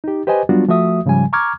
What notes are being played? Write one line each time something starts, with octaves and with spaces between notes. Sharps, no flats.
D#4 G4
G4 B4 C5 D#5 G#5
F#3 G3 B3 D4 F4 F#4
F3 A3 F#4 E5 D#6
G#2 C#3 F3 G3 G#5
A#5 C#6 D6 F6 G#6